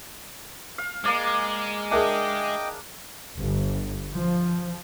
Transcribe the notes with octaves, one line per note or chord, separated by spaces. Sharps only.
F5
G#3 A#3 D5 F5
D4 G#4 A#4 D#5 E5 G5 D6
G1
F3